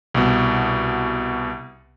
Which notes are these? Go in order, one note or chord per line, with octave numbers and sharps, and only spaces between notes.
C2 B2